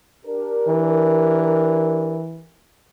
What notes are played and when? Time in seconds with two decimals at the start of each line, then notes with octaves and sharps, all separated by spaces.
0.25 D4 G4 A#4
0.67 E3